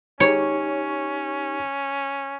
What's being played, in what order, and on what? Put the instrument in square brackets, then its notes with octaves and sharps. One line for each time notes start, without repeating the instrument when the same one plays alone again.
[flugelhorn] C#4 [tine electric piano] D#4 G4 C#6 [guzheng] C#5